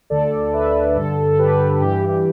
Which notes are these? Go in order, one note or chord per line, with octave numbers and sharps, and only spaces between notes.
D2 D3 A4 D5
B4 E5
G2 D3 A4
A4
G4 B4
G2 E3 G4
G4